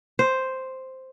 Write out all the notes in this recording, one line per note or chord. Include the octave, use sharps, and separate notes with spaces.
C5